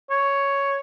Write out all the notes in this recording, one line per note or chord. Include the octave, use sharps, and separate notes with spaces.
C#5